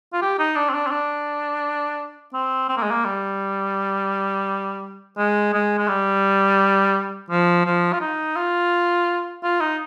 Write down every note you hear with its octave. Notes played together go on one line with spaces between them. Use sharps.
F4
G4
D#4
D4
C4
D4
C4
D4
C4
C4
A#3
G#3
A#3
G3
G#3
G#3
G#3
G3
F3
F3
F4
D#4
F4
F4
D#4